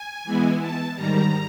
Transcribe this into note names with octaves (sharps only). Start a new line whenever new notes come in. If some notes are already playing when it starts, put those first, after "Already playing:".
Already playing: G#5
E3 G#3 B3 E4
A5
G#2 D#3 G3 A#5